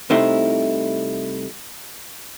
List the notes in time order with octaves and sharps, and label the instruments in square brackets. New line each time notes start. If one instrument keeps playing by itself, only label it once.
[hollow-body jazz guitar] C2 C3 A3 D#4 E4 C6